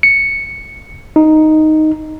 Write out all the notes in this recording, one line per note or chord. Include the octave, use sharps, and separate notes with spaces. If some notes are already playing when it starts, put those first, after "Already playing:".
C#7
D#4